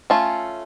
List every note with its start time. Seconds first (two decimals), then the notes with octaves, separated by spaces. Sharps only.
0.10 A3 C#4 F4